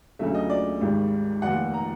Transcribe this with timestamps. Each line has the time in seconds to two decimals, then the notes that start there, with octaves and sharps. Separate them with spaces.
0.19 D2 C#3 F#3 A3 E5
0.35 D#5
0.50 D5
0.80 G#1 G#2 D#3 G3
1.42 F1 D#2 D#3 F#5
1.74 A#5